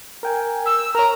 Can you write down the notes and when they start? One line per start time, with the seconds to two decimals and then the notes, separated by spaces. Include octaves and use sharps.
0.23 A#4 G5 G#5
0.66 E6
0.95 A#4 C#5 A#5